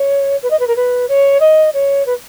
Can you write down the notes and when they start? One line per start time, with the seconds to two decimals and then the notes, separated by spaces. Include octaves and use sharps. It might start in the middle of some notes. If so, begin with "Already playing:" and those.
Already playing: C#5
0.43 B4
0.51 D#5
0.59 B4
0.67 A#4
0.76 B4
1.09 C#5
1.40 D#5
1.74 C#5
2.06 B4